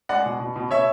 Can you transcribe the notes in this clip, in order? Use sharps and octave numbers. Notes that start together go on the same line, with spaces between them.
G#3 D5 F#5
B2
B2
B2
B2 C#5 E5